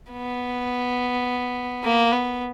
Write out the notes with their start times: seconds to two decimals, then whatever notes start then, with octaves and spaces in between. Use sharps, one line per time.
0.11 B3
1.84 A#3
2.12 B3